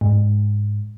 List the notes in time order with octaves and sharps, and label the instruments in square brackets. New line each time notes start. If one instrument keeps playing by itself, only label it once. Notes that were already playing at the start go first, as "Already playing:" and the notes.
[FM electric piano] G#2